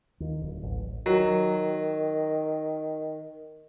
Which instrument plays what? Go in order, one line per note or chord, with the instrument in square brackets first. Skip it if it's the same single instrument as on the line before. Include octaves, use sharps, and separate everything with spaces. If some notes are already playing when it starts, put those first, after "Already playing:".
[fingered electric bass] D#2
D1
A1
[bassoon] D#3 [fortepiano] F#3